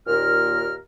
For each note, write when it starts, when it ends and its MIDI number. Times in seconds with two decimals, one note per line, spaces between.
0.07 0.75 39
0.07 0.75 46
0.07 0.75 70
0.07 0.75 89